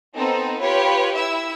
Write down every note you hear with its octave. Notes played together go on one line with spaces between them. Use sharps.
B3 C4 D#4 A4
F4 G4 B4 C#5
E4 E5 E6